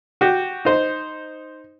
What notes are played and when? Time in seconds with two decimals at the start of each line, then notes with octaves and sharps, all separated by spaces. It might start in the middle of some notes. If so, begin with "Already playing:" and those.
0.21 F#4 G4
0.65 D#4 C5